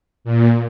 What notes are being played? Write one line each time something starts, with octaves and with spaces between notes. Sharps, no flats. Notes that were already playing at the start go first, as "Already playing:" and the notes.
A#2